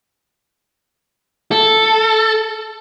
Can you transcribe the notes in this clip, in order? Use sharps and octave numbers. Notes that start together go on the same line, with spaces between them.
A4